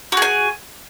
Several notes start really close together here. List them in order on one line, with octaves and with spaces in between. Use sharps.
F#4 G#4 G#5